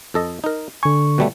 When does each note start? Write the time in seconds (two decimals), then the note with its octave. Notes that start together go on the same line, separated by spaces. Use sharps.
0.14 F2 A4 D#5
0.44 D#4 A#4
0.83 D3 G#5 C#6
1.18 B2 G3 A3